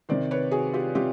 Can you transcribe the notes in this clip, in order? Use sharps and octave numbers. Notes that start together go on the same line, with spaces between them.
C3 D#3 C5 D5
B4 C#5
F#4 G#4
F4 G4
C3 F4 G4